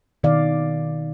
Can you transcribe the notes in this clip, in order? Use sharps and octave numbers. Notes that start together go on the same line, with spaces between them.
B2 D#3 D5 F5